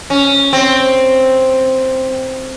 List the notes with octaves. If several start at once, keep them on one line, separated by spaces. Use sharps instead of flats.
C#4
C4